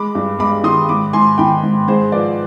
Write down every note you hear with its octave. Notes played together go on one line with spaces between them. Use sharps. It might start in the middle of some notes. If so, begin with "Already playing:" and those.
Already playing: G#3 B5 D6
G2
G#3 B5 D6
D#3 C6 D#6
G#2 B5 D6
G#2 G#5 C6
D#3 G5 B5
G#2
G#2 G#4 C5
F3 B4 D5